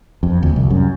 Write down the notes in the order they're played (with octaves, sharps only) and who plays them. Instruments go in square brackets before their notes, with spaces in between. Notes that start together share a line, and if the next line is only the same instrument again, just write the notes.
[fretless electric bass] F2
D2
C2
F#2